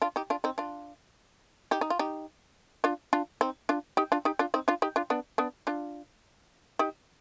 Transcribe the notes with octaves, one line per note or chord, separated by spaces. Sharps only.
D4 F4
D#4 G4
D4 F4
C4 D#4
D4 F4
D#4 G4
D#4
F4
D#4 G4
D4 F4
D4 F4
C4 D#4
D4 F4
D#4 G4
D4 F4
D#4 G4
D4 F4
C4 D#4
D4 F4
D#4 G4
D4 F4
B3 D4
B3 D4
D4 F4
D#4 G4